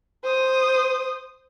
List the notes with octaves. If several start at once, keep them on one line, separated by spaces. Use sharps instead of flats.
C5 D#6